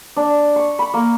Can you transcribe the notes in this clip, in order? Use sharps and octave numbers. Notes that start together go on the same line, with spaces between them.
D4
C#6
B5
A#3